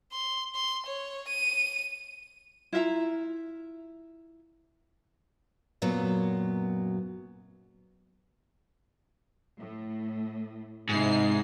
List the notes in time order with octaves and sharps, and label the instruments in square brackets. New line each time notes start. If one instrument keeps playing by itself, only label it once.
[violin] C6
C6
C#5
D#7
[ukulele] E4 F4 E5 A#5
[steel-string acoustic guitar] F#2 A#2 F#3 B3
[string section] A2
[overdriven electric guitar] G#2 [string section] C3 E4 C7 [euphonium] D#4